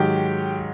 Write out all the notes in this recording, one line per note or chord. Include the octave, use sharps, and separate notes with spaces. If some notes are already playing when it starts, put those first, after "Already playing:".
Already playing: G#2 D#3 F#3 G4 G5